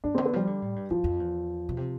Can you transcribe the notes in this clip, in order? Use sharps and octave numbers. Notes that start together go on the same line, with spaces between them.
G2 D4
D3 C4
B3
F3 G3
D3
A2
G2
F2 F3
F2
E2
B2
C3